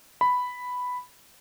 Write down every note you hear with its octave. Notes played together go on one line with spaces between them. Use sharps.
B5